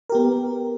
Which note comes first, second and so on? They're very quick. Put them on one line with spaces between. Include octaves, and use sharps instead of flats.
A#4 G4 B3